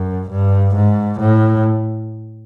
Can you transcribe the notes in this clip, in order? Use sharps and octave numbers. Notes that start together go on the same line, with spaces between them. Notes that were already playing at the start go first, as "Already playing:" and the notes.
Already playing: F#2
G2
G#2
A2